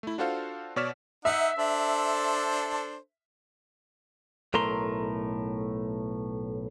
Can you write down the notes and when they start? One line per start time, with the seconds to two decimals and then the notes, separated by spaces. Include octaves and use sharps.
0.03 A3 E4
0.18 D4 F4 F#4 A4 C5 F5
0.76 B2 C#5 D5 F6 B6 E7
1.25 D#4 E5 F#5
1.59 D4 A4 C5
4.54 B1 A2 A3 A#4 A#5 C6